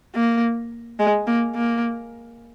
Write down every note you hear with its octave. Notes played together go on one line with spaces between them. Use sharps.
A#3
G#3
A#3
A#3